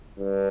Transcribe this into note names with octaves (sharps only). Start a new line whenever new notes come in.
G2